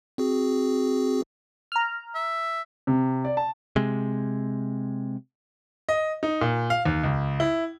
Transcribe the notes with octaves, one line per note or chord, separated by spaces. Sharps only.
C4 F#4 G#4
A#5 F6
E5
C3
D5
A5
C3 G#3
D#5
D#4
A#2
F5
D#2
C#2
E4